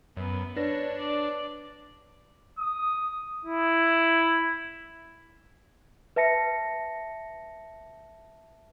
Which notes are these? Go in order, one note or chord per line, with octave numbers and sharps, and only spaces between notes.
F#2 B3
D4 B4 C#5 A#6
D5
D#6
E4
B4 E5 A5 A#6 C#7